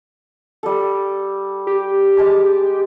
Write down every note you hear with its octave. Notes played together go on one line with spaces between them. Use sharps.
G3 A4
G4
G#3 A5 D6